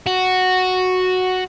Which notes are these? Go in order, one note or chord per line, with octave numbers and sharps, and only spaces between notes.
F#4